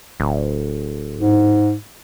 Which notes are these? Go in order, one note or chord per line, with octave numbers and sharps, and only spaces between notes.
D1
G#2